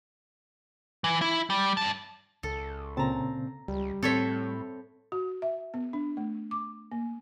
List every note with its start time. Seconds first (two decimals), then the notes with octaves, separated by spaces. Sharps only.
1.04 E3
1.22 E4
1.50 G3
1.77 G2 A5
2.43 C#2 A4
2.97 A#2 C#3 C4 A5 A#5
3.68 C#2 G3
4.03 A2 C4 A4 C5 C#5 E5
5.12 F#4
5.42 E5
5.74 B3
5.93 D4
6.17 A3
6.51 D6
6.92 A#3